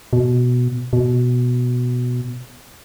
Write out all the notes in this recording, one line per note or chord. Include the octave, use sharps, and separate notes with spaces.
B2
B2